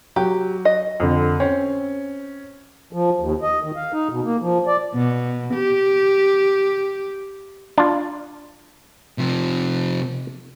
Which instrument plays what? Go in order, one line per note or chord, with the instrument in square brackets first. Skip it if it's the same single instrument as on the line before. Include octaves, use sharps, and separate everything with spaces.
[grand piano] F#3 [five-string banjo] G4
[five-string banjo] D#5
[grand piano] F2 D3
[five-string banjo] C4 [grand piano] C#4
[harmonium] F3
D#2
D#5
D#3
F5
D#4
B2
A#3
F3
D5
[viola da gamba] B2
G4
[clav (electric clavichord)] D4 F4
[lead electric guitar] C3 F3